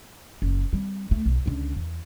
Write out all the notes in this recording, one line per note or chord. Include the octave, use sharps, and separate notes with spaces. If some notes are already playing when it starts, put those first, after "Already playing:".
F#1
G3 C4
D2 A3
B1
C#2 D3
E2